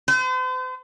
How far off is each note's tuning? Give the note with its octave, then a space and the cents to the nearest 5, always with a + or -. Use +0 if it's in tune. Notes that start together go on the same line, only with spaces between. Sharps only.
C5 -45